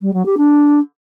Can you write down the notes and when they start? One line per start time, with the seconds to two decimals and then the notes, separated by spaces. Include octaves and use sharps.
0.02 G3
0.13 F#3
0.25 G4
0.37 D4